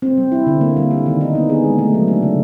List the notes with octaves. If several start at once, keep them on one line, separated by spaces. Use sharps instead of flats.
C4
G3
E4
D3
A#3
G3
D4
D#3
D#4
B3
G#4
G#3
A3
F#3
D4
C#3